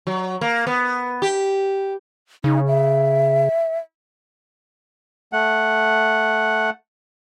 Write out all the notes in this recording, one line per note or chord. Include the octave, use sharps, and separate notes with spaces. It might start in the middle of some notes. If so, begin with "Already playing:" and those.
F#3
A#3
B3
G4
C#3 D#4
E5
A3 F#5